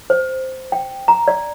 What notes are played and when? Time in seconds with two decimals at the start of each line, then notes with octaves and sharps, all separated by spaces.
0.10 C5
0.72 G5
1.08 A#5
1.28 D5